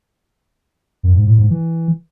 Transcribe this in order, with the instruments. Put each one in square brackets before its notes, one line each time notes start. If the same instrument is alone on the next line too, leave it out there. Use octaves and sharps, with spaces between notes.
[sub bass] F#2
G#2
A2
G#2
E3